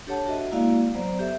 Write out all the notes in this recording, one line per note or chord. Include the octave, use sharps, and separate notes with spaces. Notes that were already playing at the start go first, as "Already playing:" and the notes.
D4 G4 A4 C#5 F#5 A5
D4 F#4 A4 D#5 E5
G#3 A#3 E4 F#4 D5 F5
F#3 B3 C5 D5 A#5
G4 A4 E5